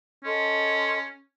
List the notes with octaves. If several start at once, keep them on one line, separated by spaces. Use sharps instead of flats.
C#4 A4 D#5 C6